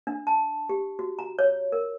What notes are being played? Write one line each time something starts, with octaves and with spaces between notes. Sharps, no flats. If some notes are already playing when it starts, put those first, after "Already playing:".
D4
A5
G4
F#4
A#5
C#5
A#4